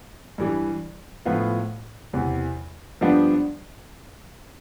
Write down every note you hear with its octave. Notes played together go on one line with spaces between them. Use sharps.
G2 E3 G3
A2 F3 B3 F4
E2 C3 E3
G2 F3 B3 D4 G4